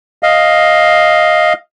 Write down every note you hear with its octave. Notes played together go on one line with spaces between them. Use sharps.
D#5 F5